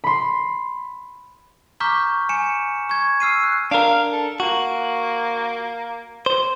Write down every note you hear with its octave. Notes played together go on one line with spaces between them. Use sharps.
B5 C6
A#5 C#6 D6 F6 G6 B6
G#5 C#7 E7
C#6 G#6
E6 F6 C7 D#7
F#6
D4 A#4 F5
A4
A#3 F#4
C5